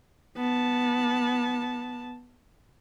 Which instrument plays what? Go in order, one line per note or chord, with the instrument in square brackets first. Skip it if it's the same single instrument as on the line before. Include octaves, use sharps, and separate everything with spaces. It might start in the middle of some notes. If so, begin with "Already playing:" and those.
[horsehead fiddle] B3 A5